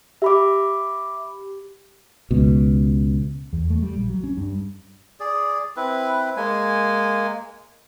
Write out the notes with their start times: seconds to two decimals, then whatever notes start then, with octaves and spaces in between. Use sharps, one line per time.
0.22 G4 E5 B5 D6
2.31 C#2 B2
3.53 E2
3.70 A3
3.83 G3
3.96 A#1
4.09 F#3
4.24 C#4
4.37 G2
5.20 G#4 D5
5.76 C4 E4 B4
6.37 G#3 A#3 G#5